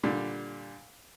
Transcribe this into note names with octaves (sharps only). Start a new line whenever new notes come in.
A#2 D3 G3